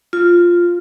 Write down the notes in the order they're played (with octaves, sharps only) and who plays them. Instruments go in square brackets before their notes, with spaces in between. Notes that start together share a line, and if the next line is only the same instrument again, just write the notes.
[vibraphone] F4